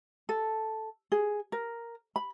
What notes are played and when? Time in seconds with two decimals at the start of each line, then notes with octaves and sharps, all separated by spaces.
0.29 A4
1.12 G#4
1.52 A#4
2.16 B5